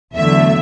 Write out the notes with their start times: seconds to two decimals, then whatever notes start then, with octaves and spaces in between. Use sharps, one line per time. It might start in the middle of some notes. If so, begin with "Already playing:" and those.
0.15 E2 D3 F#3 A3 E5